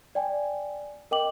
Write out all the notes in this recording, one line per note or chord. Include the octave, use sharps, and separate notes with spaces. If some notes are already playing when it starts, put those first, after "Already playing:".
D5 G5 G#5
A#4 D#5 G5 D6 F#7